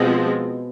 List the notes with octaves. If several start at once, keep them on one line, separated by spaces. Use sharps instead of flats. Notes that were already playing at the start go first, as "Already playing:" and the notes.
Already playing: B2 F3 G#3 C4